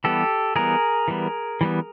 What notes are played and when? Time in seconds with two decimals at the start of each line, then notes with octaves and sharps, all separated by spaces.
0.04 E3 G3 B3 G4 A4
0.55 E3 G3 B3 G#4 A#4
1.08 E3 G3 B3
1.61 E3 G3 B3